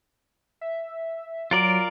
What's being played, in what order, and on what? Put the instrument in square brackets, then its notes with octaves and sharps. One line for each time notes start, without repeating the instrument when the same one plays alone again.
[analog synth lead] E5
[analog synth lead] F#3 [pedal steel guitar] F4 A#4 D5